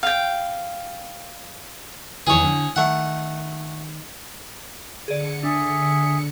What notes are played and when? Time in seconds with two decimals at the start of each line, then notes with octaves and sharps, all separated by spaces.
0.03 F5 G5
2.27 E2 D#3 E3 G#4 C#5
2.44 D3
2.76 D#3 A3 F#5
5.08 D3 G#4 D5 C#7
5.43 D4 G#4 E5